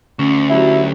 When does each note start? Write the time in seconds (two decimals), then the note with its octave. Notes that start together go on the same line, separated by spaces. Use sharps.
0.19 D2 C#4
0.50 F#3 E4 G4